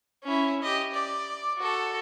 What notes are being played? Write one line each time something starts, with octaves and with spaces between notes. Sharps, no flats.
C#4 E4
G4 D#5
D5
F#4 A4